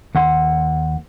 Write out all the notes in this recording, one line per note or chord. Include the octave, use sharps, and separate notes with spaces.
D#2 F#5 C6